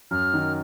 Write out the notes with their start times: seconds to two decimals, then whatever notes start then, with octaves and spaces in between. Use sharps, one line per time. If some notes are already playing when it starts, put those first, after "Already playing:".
0.11 F#2 F6
0.34 D#3